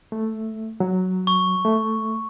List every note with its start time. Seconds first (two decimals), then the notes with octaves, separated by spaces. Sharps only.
0.12 A3
0.80 F#3
1.27 C#6
1.65 A3